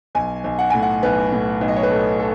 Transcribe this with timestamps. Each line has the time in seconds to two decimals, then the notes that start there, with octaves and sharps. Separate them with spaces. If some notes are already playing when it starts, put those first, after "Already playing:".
0.15 B1 G#5
0.44 B1
0.59 F#5
0.70 A2 G#5
0.82 F#5
1.03 B1 B4
1.32 A2
1.61 B1
1.68 D#5
1.76 C#5
1.83 B4
1.90 A2 A4
2.19 A4